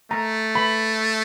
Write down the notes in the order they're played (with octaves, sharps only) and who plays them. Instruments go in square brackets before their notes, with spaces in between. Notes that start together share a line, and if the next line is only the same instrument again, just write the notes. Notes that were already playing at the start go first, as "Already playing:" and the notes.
[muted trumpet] A3 [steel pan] A#5
[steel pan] B5